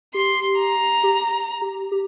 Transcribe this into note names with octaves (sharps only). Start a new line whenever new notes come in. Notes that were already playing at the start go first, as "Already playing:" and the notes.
G4 C6
A#5
G4
G4
G4